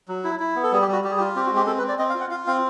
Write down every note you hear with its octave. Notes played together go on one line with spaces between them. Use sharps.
F#3
E4
E4
B3
A4
G3 G#4
G4
G3 F#4
G3 G4
G#4
F4 G4
C4 G4
F#4
G#3
G4
C4 A4
B4
C4
D5
C4 D#5
F5
F4
F#5
F4 F5
C4 F5